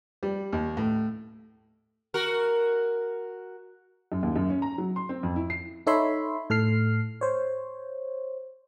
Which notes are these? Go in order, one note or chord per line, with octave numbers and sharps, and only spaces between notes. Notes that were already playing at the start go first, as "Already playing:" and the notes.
G3
D#2
A2
F#4 A#4
F#2
D#2
F#2
C#4
A#5
F#3
C6
C4
F2
E4
C7
D#4 A4 C#5 E5 B5 C6
A2 A4 F6 C7
C5 C#5